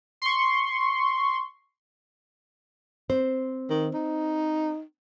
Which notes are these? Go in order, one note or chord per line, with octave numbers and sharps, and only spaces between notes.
C6 C#6
C4 C5
D#3
D#4